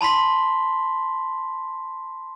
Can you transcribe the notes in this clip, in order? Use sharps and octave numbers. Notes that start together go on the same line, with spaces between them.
A5 B5 C6 B6